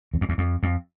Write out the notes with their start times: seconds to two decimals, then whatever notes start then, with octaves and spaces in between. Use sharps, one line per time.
0.14 E2
0.21 F2
0.29 E2
0.38 F2
0.63 F2